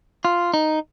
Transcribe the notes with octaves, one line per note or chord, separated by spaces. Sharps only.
F4
D#4